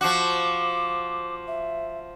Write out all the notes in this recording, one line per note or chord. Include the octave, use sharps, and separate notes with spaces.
F3 F#4 D6
E5